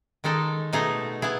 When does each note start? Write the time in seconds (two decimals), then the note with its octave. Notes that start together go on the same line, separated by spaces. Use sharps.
0.24 D#3 G#3 D#4 A4
0.73 B2 A3 D#4 G#4
1.22 B3 E4 G#4